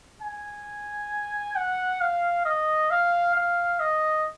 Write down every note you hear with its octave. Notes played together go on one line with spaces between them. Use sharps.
G#5
F#5
F5
D#5
F5
F5
D#5